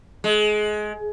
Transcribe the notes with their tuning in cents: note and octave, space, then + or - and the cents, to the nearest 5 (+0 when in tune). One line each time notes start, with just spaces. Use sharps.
G#3 +25